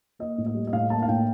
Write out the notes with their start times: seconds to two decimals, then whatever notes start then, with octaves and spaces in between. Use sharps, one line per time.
0.19 A#3 D#5
0.38 A2
0.46 D#5
0.55 G3
0.67 D#5
0.73 A2 F5
0.90 A#3 A5
1.02 F5
1.08 A2 G5